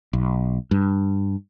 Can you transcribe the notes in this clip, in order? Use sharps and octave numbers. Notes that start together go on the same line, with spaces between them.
B1
G2